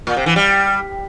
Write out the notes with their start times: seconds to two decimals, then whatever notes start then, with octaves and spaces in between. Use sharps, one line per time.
0.07 A#2
0.17 C3
0.26 E3
0.36 G3